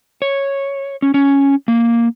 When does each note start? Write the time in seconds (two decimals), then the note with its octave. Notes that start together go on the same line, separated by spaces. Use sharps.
0.22 C#5
1.02 C#4
1.14 C#4
1.68 A#3